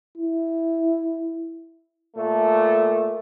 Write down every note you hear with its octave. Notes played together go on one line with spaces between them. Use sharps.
E4
A#2 A3